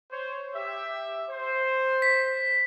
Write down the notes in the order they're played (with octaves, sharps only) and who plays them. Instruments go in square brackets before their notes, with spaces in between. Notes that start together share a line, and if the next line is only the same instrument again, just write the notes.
[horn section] C5 C#5
G4 E5
C5
[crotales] B6